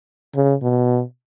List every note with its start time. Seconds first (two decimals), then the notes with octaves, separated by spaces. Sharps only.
0.35 C#3
0.62 B2